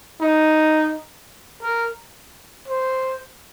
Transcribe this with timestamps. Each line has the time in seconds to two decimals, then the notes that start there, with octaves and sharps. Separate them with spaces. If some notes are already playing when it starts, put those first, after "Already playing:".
0.21 D#4
1.63 A#4
2.68 C5